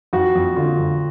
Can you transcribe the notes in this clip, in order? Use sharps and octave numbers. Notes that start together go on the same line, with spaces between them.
F2 F#4
F2
D3 F4
F2